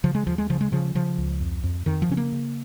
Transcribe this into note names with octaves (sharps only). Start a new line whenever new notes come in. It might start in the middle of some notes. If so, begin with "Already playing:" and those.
C#3 F3
G#3
D#2 F3
G#3
C#3 F3
G#3
C#3 F3
C#3 F3
C#2
F2
F2
F2 D#3
F3
C#3 C#4
A#3
C#3